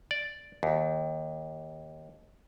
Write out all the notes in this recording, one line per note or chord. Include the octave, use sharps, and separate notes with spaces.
D5
D#2